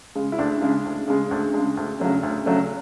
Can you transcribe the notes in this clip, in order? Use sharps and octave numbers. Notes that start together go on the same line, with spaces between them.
C#3 G#3
E4
D2 D4
C#3 G#3
D2
C#3 G#3
D2 D4
C#3 G#3
D2
C#3 F#3 A3
D2
C#3 F#3 A3